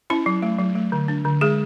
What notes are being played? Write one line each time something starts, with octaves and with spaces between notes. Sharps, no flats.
C#4 E4
F#3
A3
F#3
A3
D3
D4
D3
G#3 G#4